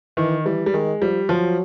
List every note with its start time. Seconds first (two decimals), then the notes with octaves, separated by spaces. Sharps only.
0.17 D#3 E3
0.45 E3 G3
0.66 G3
0.74 D#3 G#3
1.02 F3 G3
1.29 F3 F#3